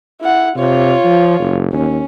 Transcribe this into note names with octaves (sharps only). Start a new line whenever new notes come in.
E4 F#5
C3 F4 C#5
F3
F#1
D#2 C#4